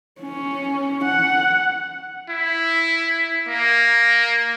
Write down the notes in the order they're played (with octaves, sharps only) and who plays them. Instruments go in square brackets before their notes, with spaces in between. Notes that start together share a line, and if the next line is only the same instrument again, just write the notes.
[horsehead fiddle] C#4
F#5
[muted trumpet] E4
A#3